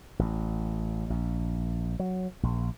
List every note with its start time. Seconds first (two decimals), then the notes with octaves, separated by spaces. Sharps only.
0.19 A1
1.10 A#1
1.99 F#3
2.43 A#1